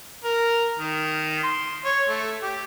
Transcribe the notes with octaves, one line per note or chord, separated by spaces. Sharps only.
A#4
D#3
C6
C#5
A3
G4